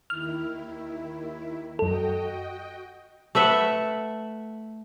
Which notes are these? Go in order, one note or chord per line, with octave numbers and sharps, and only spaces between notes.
D#2 D#3 E4 F6
F#2 F#4 A4 D#5 G5
A3 B4 E5 F#5